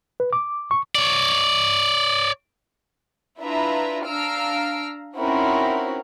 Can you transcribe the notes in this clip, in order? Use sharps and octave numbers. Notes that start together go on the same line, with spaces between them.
B4
D6
C#6
C#5 D5
D4 E4 F4 B4 E5 A#5
D4 F5 A#5 E6 F6 D7
C4 C#4 D#4 E4 F#4 A#4